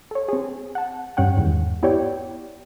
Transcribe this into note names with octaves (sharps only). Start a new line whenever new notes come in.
A4 C#5
C4 G#4
F#5 A5
G2 C#4 F#5 G5
E2 G#2 D#3
B3 E4 G4 C#5 D5 G5